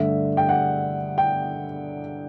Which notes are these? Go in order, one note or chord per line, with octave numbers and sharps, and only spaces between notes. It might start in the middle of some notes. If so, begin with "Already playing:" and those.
Already playing: G2 D3 A3 E5
G5
F#5
G5